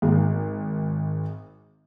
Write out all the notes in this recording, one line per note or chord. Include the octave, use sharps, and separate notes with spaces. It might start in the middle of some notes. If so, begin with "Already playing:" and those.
G#1 G#4